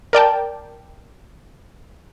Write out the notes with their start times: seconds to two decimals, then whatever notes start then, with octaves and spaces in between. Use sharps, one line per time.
0.13 A#4 D5 G5 A5